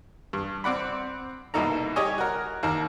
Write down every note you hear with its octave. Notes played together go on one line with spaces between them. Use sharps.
G2
C4 D5 F#5 B5
C2 B2 A#3 D#4 A4 A#5
G4 C#5 D#5 G#5
F#4 A#4
D#2 A#4